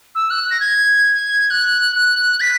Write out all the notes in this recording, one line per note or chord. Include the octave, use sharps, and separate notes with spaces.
E6
F#6
A#6
G#6
F#6
F#6
B6